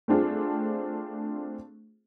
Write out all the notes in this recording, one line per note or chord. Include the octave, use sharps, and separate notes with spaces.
A3 C4 D4 F4 G#4